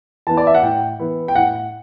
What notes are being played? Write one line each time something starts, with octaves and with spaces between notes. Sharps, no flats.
E3 B3 E4 A5
D5
E5
F#5
A2 G5
E3 B3 E4
G5
A2 F#5